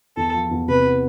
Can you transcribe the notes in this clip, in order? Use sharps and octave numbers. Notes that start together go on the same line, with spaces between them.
E2 A4
F3
E2
C3 B4
B3